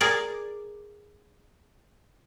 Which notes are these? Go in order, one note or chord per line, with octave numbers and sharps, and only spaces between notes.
G#4 A#4 D5